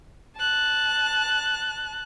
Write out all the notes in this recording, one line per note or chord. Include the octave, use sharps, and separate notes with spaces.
A5 F#6